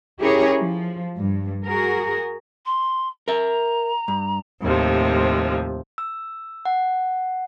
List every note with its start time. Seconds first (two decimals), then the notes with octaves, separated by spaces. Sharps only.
0.20 C#4 E4 G4 G#4 A#4 C#5
0.59 F3
1.17 G2
1.66 F#4 G#4 A#4
2.66 C6
3.28 A#4 E5 A#5
4.08 G2
4.62 D#2 A2 C3 F3
5.98 E6
6.65 F#5